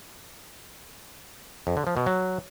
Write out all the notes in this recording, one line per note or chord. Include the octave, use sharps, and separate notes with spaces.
F2
D3
F3
B2
F#3